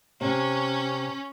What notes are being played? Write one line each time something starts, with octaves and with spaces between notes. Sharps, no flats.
C3 C#4